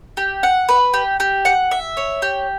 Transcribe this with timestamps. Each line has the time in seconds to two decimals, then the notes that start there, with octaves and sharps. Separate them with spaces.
0.17 G4
0.43 F#5
0.69 B4
0.94 G4
1.20 G4
1.45 F#5
1.71 E5
1.97 C#5
2.22 G4